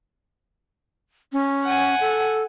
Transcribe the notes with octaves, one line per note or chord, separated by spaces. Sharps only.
C#4
F#5 G#5
A4